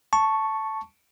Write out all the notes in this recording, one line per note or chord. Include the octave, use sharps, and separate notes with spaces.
A5 C#6